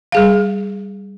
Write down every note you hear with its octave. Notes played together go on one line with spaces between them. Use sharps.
G3 G#4 F5